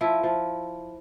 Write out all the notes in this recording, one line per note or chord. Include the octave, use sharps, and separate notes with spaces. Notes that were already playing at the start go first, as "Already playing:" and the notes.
F3 E4
F3